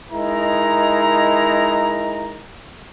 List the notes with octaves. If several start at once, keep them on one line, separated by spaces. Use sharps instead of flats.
G#3 D#4 E4 A#4 A#5